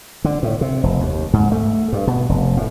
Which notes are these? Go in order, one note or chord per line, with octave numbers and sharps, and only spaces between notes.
D3
A2
C3
F1
D#2
G#2
A3
G2
B2
F1
A2